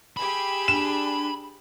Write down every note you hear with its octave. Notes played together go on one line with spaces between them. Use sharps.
G4 G#4 B5 E6
D4 E7